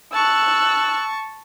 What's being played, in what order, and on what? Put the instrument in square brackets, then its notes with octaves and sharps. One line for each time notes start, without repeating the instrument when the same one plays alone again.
[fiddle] A5 C#6 [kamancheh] E6 F#6